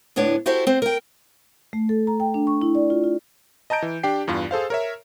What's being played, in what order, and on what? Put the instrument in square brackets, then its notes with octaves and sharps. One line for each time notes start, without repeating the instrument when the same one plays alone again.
[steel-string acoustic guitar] D2 A2 B3 D4 C#5
E4 F#4 G4 A4 C5 E5
C4 C5
A#4 G5
[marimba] A3
A4
A#5
G5
D4
C#6
E4
D5
F4
F4
[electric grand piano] D#5 A5 A#5 G6 D7
E3
D4 G4 G5 C7
E2 G2 F4
G#4 A4 C5 F5
A#4 C#5 E5